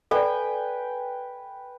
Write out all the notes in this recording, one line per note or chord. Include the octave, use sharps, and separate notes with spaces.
A4 B4 D5 G5 G#5